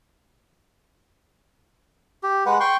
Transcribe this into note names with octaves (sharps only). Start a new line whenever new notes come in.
G4
G#3 B4 F#5
G5 C6 C#6